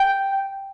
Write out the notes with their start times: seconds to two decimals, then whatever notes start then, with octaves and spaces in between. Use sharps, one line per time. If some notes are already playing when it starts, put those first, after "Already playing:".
Already playing: G5